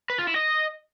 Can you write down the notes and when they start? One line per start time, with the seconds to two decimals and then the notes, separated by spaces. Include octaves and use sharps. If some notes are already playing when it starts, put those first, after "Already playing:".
0.10 B4
0.18 F4
0.27 E4
0.36 D#5